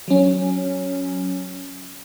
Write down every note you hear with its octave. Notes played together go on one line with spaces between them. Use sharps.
F#3 C#4